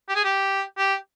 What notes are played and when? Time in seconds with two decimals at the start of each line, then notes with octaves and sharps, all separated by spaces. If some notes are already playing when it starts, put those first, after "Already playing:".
0.09 G4
0.15 G#4
0.24 G4
0.78 G4